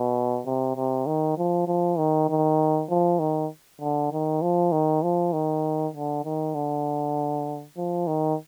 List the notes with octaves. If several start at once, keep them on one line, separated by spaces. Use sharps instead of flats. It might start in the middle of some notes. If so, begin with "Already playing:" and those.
Already playing: B2
C3
C3
D#3
F3
F3
D#3
D#3
F3
D#3
D3
D#3
F3
D#3
F3
D#3
D3
D#3
D3
F3
D#3